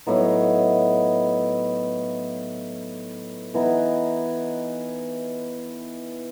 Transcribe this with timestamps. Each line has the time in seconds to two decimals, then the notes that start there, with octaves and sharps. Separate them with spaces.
0.06 A2 F#3 B3 D#4
3.54 E3 B3 D#4